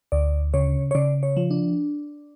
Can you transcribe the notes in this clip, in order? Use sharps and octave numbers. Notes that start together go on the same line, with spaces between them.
D2 D5
C#3 C#5
C#5
C#3 D5
C#5
F3
D4